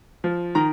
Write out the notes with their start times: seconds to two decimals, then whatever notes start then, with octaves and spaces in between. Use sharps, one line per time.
0.24 F3
0.55 D#3 A#5